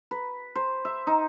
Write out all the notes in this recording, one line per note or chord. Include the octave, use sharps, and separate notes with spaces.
B4
C5
E5
D#4